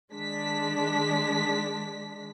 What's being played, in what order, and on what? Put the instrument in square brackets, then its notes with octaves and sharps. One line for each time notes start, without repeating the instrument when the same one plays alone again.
[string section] D#3 G#3 D4 B6